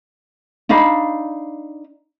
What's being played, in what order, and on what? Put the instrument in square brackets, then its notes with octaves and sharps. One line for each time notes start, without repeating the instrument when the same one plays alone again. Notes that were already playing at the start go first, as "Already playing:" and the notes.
[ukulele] D4 D#4 F5 B5